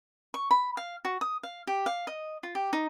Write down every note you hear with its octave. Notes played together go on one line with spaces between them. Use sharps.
C#6
B5
F5
F#4
D#6
F5
G4
F5
D#5
F4
G4
D#4